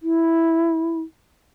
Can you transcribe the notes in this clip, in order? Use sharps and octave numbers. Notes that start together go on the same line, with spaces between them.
E4